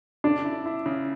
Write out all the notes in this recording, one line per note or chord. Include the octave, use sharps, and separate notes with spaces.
C#3 D4
E4
E4
C#3